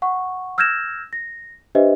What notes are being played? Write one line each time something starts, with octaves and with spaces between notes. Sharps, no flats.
F#5 C#6
E6 F6 G6 G#6 A#6 E7
A#6
D4 G4 B4 C5 D#5 E5